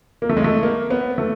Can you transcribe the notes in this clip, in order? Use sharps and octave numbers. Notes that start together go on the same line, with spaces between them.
A#3
A3
G#3
A3
A#3
B3
A3